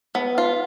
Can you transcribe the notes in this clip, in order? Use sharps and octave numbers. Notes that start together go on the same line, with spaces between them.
B3
F4